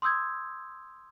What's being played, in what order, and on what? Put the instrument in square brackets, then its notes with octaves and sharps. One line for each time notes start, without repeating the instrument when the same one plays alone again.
[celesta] C6 D#6 E6 G6 G#6